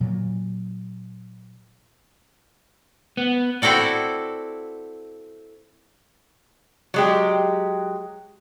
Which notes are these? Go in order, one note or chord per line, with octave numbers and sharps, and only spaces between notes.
A#2 F#3
B3
C4 E4 F#4 A4 D5
F#3 G#3 G4